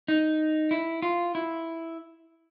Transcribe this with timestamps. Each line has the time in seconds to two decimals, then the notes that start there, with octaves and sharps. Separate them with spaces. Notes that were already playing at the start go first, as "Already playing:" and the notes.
0.08 D#4
0.71 E4
1.02 F4
1.35 E4